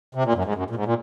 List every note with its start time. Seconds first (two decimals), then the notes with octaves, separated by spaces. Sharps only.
0.15 C3
0.24 A#2
0.34 F#2
0.45 G#2
0.55 F#2
0.70 A#2
0.75 G#2
0.85 A#2